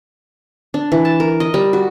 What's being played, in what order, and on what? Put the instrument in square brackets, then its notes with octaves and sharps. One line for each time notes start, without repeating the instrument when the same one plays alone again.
[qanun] D4
E3
A5
A#4
D#5
G3
F#4